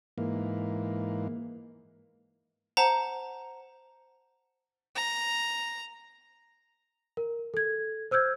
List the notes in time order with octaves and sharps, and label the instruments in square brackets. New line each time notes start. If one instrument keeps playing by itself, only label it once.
[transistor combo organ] G#2 E3 A#3
[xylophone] C5 F#5 A5 A#5
[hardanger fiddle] A#5
[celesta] A#4
A4 G#6
C5 E6 F6 G6 G#6